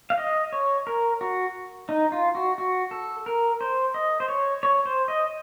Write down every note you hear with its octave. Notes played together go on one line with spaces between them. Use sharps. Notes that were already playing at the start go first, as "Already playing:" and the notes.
F5
D#5
C#5
A#4
F#4
D#4
F4
F#4
F#4
A4
A#4
C5
D#5
C5
C#5
C#5
C5
D#5